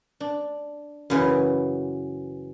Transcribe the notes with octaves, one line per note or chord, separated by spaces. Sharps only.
D4
F#2 C#3 E3